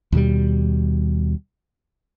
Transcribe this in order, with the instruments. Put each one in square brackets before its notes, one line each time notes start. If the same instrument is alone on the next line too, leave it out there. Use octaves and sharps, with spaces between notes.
[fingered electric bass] D#2 B2 G3